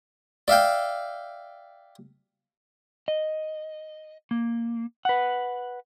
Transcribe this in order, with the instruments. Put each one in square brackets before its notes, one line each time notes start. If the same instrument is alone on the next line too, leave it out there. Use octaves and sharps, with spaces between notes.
[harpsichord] D5 E5 F5 G5
[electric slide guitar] D#5
A#3
B4 F#5